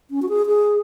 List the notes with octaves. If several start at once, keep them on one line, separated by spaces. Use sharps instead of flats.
C#4
F#4
G#4
G#4